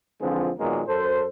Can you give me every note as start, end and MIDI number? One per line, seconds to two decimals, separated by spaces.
0.21 0.51 41
0.21 0.51 50
0.21 0.51 52
0.21 0.51 53
0.21 0.51 56
0.21 0.51 60
0.59 0.82 46
0.59 0.82 51
0.59 0.82 54
0.59 0.82 56
0.59 0.82 58
0.59 0.82 59
0.88 1.25 42
0.88 1.25 69
0.88 1.25 72